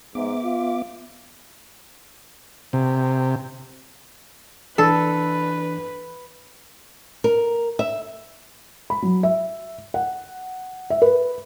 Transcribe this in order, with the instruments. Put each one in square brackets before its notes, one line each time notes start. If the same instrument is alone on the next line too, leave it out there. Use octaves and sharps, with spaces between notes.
[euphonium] G#2 [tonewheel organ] B3 E5 D6
[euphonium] F4
[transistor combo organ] C3
[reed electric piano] E3 D4 [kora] A4 [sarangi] B4
[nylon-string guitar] A#4
E5
[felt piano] B5
F#3
E5
F#5
E5
B4